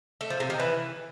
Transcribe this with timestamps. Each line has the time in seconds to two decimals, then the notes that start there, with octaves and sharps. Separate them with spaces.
0.21 A3
0.30 F3
0.40 C3
0.50 D#3
0.60 E3